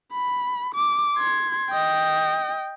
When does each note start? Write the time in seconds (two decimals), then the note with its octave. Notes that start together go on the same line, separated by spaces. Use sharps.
0.13 B5
0.74 D6
1.17 C6 G#6
1.70 D#5 G5